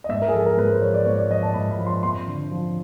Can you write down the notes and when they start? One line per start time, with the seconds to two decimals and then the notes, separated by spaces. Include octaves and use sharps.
0.04 D#5
0.09 G#2 E5
0.22 A#4
0.28 G#4
0.33 F3 A4
0.46 A#4
0.57 G#2 B4
0.69 C5
0.81 F3 C#5
0.94 D5
1.06 G#2 C#5
1.19 D5
1.30 F3 D#5
1.43 A5
1.54 G#2 B5
1.71 B5
1.79 F3
1.86 C6
2.03 F2 C6
2.27 D3
2.52 F3